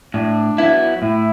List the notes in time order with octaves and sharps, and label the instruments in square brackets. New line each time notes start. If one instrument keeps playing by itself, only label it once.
[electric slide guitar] A2 [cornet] D4
[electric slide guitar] F#3 B3 E4
[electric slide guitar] A2 [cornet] E4